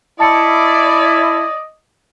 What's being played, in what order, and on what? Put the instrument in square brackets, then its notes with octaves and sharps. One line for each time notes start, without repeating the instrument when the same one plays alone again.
[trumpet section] E4 [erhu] D5 [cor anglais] D#5 [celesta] A5 A6 C#7